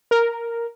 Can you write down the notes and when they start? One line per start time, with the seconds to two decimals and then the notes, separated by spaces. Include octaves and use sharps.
0.11 A#4